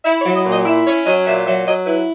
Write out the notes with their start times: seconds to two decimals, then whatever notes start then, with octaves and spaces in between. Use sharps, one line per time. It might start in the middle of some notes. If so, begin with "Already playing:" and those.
0.05 E4 E5
0.20 C#5
0.26 F#3
0.35 D#5
0.46 A#2
0.51 D#5
0.65 E4 E5
0.86 C#4 C#5
1.06 F#3 D#5
1.26 A#2 E5
1.46 F#3 E5
1.66 F#3 D#5
1.86 E4 B4